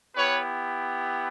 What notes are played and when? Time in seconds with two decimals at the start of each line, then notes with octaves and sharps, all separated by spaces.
0.16 B3 E4 G4 B4 C#5